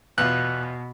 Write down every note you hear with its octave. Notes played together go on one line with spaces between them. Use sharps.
E2 B2 B3 F4 F#6